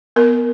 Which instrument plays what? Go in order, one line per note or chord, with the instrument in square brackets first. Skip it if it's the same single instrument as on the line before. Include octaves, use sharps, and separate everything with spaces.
[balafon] B3 A#4